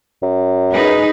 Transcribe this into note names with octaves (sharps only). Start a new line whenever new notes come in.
F#2
D#4 G#4 B4